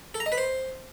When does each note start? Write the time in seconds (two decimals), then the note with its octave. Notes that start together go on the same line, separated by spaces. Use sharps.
0.14 A4
0.20 A#5
0.26 D#5
0.32 B4
0.38 C5